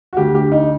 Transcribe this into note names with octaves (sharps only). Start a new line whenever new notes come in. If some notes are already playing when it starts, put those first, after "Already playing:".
F#4
D2 D3 G4
G4
D#4